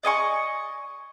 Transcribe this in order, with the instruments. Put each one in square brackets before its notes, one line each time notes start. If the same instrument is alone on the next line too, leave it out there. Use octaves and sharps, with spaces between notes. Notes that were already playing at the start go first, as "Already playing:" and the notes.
[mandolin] D5 D#5 G#5 C#6